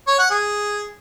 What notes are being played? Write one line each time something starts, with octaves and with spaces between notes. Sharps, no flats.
C#5
F#5
G#4